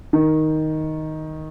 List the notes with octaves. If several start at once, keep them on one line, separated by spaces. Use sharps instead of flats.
D#3